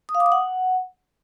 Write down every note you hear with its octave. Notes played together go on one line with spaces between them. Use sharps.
D#6
F5
D6
D#6
F#5